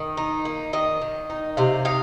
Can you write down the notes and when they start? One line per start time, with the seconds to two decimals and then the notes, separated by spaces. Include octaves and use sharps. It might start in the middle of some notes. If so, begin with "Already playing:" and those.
Already playing: D#3
0.17 D#4
0.45 A#3
0.73 D#3 D#5
1.01 D#3
1.30 D#4
1.57 C3 F5
1.85 D#4 F5